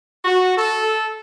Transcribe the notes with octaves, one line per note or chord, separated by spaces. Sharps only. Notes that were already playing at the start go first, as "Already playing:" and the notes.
F#4
A4